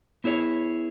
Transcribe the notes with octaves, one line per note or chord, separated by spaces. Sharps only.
B3 E4 G#4 C#5